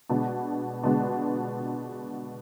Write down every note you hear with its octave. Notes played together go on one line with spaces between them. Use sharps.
B2 G#3 B3 D4
B2 G#3 B3 D4